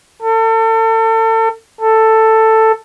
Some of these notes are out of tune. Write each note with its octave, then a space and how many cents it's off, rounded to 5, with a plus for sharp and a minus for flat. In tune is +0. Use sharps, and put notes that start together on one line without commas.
A4 +35
A4 +10